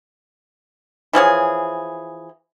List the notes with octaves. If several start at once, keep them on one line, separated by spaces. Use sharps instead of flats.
E3 F3 G#4 C#5